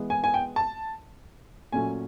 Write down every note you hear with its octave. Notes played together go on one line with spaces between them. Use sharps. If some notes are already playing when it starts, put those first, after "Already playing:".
Already playing: E3 G#3 B3
G#5
G#5
G5
A5
A#2 F#3 A3 C#4 G#5